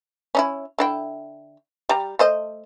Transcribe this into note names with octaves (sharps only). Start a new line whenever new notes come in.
C#4 D#4 E4
D3 E4 G5
G3 A#5
A3 C5 D#5